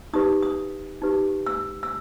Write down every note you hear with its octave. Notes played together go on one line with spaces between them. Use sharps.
D#4 G4 B4 D#6
D#6
D#4 G4 B4
E6
E6